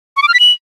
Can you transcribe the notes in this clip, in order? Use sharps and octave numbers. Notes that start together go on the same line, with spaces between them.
C#6
D6
F6
B6
F#7